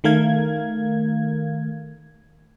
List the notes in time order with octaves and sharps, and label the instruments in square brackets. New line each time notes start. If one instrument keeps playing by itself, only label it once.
[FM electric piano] D#3 A3 A#4 F5 G#6